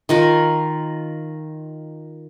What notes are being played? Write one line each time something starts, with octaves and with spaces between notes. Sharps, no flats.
D#3 F4 A#4